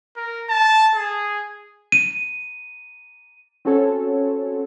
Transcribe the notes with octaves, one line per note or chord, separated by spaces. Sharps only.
A#4
A5
G#4
D#7
C4 C#4 F#4 A4 C#5